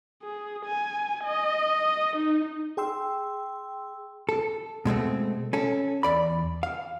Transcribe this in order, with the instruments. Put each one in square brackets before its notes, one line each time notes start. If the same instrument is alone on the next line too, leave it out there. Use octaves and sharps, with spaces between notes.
[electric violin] G#4
G#5
D#5
D#4
[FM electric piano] G#4 G5 C6 E6
[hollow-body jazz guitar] A4
B2 G#3 A3 C4
C#4 A4
E2 D5 B5
F5